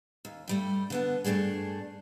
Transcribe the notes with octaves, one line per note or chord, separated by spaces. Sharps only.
D#2
G2 G3 A3
D3 B3 A5
G2 A#2 A3 D4 G#4